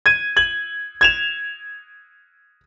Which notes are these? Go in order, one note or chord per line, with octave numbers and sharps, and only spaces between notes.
G#6 D#7
G#6 F#7
G#6 E7 F7